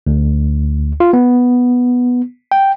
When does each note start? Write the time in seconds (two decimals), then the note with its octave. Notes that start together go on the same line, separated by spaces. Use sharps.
0.07 D2
1.00 F4
1.13 B3
2.52 G5